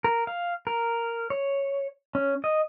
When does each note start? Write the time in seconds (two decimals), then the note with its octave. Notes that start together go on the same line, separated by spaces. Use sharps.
0.04 A#4
0.27 F5
0.67 A#4
1.30 C#5
2.15 C#4
2.44 D#5